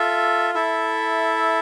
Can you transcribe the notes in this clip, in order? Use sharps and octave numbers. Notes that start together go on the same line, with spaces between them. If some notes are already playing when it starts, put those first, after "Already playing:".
Already playing: F4 A4 E5
E4 A4 E5